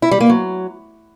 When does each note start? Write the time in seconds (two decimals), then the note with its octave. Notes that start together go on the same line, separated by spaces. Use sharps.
0.02 E4
0.11 G3
0.20 A#3
0.30 F#3